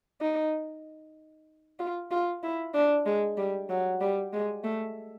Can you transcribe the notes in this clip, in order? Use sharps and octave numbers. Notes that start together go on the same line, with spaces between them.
D#4
F4
F4
E4
D4
G#3
G3
F#3
G3
G#3
A3